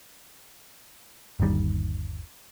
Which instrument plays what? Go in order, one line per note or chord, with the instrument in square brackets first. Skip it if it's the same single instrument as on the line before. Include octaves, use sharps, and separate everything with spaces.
[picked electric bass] G1 D#2 D#3 G3